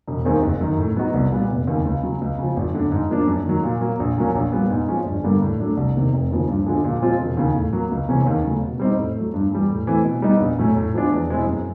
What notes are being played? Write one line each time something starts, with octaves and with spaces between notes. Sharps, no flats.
E1
D#2 D#3 G#3 C4
F#1
F#2 D#3
A2
F#3 B3 D#4 F#4
C2
A#2 G3 B3
F1
D#2 C#3
C#2
C#3 F#3
C#2
C#3 F3
G#1
F#2 D3
G#2
F3 A#3 D4
F#2
D#3 F#3
A#2
F#3 A#3
A#1
A#2 F#3 A#3 C#4
A#1
A#2 G3 B3
G#2
F3 G#3 C#4
G1
G2 D3 G3 A#3
A2
F#3 A3 D4
C2
C3 D#3
F1
D#2 C#3 F3 A#3
G2
D3 F3 G#3
A#2
F3 G#3 C4 F4
E1
D#2 C#3
A2
F#3 A#3
C#2
C3 E3 G#3 C#4
D#2
C#3 F#3 A3
B2
G3 C4 D#4
A2
A3
F#3
G2
E3 G3
A2
E3 A3 C4 E4
B2
G3 B3 D#4
A#1
A2 F#3 A3 C#4
A2
F3 G#3 B3 D4
E2
B2 G#3 C4 E4
F#2